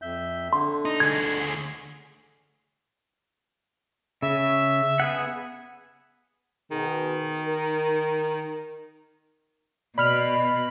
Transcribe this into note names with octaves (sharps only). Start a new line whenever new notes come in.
F2 E5 G6
D3 C6
D#4
D2 G#4 G#6
C#3 E5 E6
B3 G#4 F#5
B2 D#3 G#4
A#4
B2 D5 B5 F6 F7